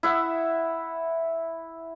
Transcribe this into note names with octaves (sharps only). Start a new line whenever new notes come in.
E4 E5 F#5